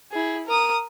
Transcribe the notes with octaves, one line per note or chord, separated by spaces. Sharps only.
E4 G#4
A#4 D#6